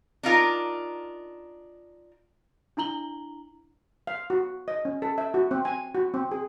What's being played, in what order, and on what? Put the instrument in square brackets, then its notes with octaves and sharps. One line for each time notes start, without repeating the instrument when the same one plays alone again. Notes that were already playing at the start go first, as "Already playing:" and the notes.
[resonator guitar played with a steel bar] D4 D#4 F4 A#4
[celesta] D4 E4 A#5 F#7 G7
[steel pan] F5
F#4
D#5
C#4
A4
E5
F#4
C4
G#5
F#4
C4
G#4